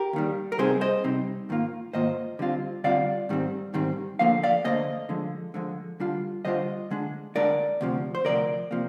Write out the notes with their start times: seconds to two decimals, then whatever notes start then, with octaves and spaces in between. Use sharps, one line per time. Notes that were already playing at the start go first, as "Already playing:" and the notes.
Already playing: G4 A#4
0.13 D#2 D#3 G3
0.52 A#4
0.58 C3 G3 C4 D#4 G#4 C5
0.81 C5 D#5
1.04 C3 G3 C4 D#4
1.49 G#2 D#3 A#3 F4
1.93 G#2 D#3 A#3 F4 C5 D#5
2.39 D3 G3 C4 F4
2.84 D3 G3 C4 F4 D5 F5
3.29 G#2 D#3 G3 C4
3.74 G#2 D#3 G3 C4
4.19 D2 D3 F3 A#3 F5
4.43 D5 F5
4.65 D2 D3 F3 A#3 C5 D#5
5.09 D3 F3 G#3
5.54 D3 F3 G#3
6.00 D3 G3 D4 F4
6.45 D3 G3 D4 F4 C5 D#5
6.91 D3 G#3 D4
7.35 D3 G#3 D4 A#4 D5
7.81 D2 C3 F3
8.15 C5
8.25 D2 C3 F3 A#4 D5
8.71 C3 F3 A#3